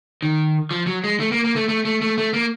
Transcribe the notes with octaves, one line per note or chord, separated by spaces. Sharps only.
D#3
F3
F#3
G#3
A3
A#3
A#3
A3
A3
A3
A3
A3
A#3